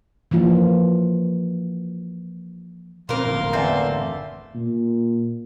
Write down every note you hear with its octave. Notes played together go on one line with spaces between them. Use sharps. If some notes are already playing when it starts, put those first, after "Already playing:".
E3 F3 A#3 F4
F2 A#2 A#3 C4 A#4 C6
F#1 A2 D3
E2 A3 C4
A#2